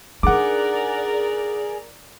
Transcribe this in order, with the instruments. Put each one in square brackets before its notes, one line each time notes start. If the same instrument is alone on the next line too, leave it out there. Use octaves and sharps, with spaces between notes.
[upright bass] D4 D#4 [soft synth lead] G#4 [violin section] A#4 D5 [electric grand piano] F#5 D6